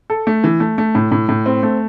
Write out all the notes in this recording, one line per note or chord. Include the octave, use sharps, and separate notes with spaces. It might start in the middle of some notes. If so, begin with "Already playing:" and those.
A4
A3
E3
A3
A3
A2
A2
A2
C4
A3